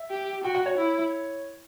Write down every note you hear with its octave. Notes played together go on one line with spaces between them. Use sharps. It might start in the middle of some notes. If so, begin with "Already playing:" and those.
Already playing: E5
G4
F#4 G5
F#5
C#5
E4